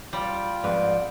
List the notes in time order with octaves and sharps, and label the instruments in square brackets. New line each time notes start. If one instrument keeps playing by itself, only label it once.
[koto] G3 [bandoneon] F4 G5
[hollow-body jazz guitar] F2 G#2 B4 [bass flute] D5